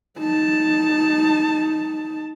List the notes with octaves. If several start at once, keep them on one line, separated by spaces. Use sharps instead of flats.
D#4 A5